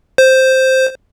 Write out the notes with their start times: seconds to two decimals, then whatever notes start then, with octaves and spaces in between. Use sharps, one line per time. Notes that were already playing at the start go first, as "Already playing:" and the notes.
0.18 C5